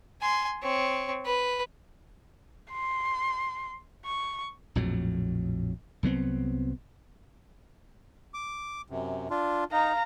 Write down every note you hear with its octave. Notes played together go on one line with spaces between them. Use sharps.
G#5 C6
C4 C#5
B4
C6
C#6
A#1 F2 A2 F#3
C2 F#3 B3 C4
D6
F#2 C3
D4 F4
D#4 F5 A#5